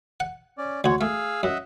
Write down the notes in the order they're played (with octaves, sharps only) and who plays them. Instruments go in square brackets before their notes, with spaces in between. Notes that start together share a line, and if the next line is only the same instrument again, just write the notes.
[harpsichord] F#5
[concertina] C#4 D5
[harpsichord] D2 F#4 [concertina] G#3 C#5
[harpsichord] A3 [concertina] G#4 F5 E6
[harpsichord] F#2 [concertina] D#5 E5 F#5